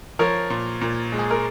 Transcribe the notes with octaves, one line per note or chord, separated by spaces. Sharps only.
F3 A#4 C#5
A#2
A#2
G#3
G#4
A#4